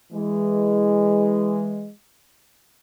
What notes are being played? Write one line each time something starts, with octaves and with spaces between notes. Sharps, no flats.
E3 G#3